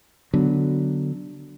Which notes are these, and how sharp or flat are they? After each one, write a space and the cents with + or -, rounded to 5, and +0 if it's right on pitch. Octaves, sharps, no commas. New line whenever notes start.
D3 +0 F#3 +5 B3 +0